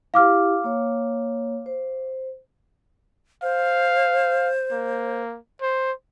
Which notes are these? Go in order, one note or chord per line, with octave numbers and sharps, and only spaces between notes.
E4 G4 F5 D6 F6
A#3 C#5
C5
C5 F5
A#3
C5